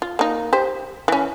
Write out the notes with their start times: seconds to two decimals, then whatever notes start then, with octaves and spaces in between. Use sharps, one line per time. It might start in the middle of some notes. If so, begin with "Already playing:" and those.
0.02 F4
0.19 A#3 D#4
0.53 G4 C5
1.08 E3 C#4